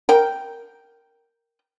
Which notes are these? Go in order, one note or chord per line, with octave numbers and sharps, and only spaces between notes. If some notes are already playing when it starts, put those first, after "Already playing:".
A#4 G5